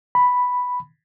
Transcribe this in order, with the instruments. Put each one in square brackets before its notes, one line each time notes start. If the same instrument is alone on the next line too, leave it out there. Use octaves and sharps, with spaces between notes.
[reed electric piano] B5